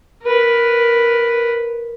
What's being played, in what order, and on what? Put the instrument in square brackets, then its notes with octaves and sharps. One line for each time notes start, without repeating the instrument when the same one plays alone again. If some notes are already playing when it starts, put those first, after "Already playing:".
[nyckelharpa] A#4 B4